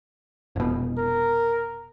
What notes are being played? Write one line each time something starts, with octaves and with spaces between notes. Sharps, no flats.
F1 B2
A#4